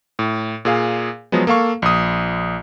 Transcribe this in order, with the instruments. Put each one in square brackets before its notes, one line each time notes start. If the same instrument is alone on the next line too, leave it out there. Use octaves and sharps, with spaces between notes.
[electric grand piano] A2
A#2 G#4 F5
F3 F#3 G#3 B3
A#3 A4 F5 C#6
A#1 D#6